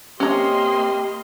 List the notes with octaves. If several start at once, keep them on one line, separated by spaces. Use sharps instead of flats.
C3 A#3 C#4 G4 D#5 A#5 C6